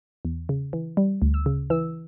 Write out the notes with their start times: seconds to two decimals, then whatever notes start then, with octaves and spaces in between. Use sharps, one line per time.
0.25 E2
0.49 C#3
0.73 E3
0.97 G3
1.22 D2
1.34 E6
1.46 C#3
1.70 E3 E6